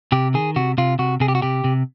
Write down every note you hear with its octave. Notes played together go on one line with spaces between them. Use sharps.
C3 G4
D#3 G#4
C3 F#4
C3 F4
C3 F#4
C3 G#4
G4
F#4
C3 G4
C3